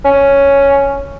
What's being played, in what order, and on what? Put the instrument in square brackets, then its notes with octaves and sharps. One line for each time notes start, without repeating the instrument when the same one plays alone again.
[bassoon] C#4